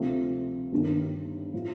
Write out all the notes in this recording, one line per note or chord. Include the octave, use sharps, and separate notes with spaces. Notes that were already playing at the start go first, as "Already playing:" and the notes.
Already playing: D2 C3 F3 A3 C4
G1 G2 D#3
A2 F3